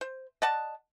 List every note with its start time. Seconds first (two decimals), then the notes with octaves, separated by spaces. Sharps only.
0.01 C5
0.42 D5 D#5 F#5 A5